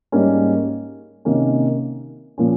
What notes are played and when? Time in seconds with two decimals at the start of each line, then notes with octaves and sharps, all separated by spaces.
0.12 G#2 G3 A#3 C#4
1.25 C3 D#3 A#3 C#4
2.38 A#2 F3 A#3 C#4